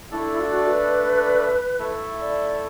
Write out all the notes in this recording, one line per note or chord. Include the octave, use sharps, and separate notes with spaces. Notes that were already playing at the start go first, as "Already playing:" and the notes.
A3 D4 E4 A4 D5
F#4
B4
A3 E4 A4 E5
D5